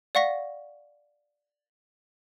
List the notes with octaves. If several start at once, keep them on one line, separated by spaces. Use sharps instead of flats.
D5 F5 F#5 C#6 A#6 B6